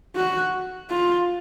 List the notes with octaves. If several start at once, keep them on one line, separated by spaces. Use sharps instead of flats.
F#4
F4